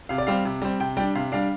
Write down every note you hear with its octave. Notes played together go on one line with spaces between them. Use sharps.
C3 F5
D5
G3 C4 F5
C3
G3 C4
C3 G5
G3 D4 G5
C3 F5
G3 D4 F5